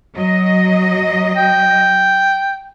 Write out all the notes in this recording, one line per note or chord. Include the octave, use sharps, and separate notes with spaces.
F#3 D#5
G5